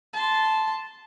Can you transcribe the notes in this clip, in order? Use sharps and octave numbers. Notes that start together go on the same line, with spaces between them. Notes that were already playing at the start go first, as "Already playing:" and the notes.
A5 C6